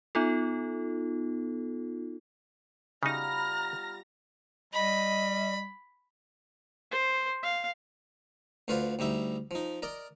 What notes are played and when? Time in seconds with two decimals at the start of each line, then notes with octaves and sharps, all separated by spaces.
0.15 B3 D#4 F4 A4
3.03 C#3 G3 B3 D#4 F4 A#5 F6 A#6
4.74 G3 D#5 B5
6.91 C5
7.43 F5
8.68 D2 D3 F4 B4 C5 F5
8.99 D2 G3 D#4 E5
9.51 F3 D#4
9.82 A#4 D5 D#5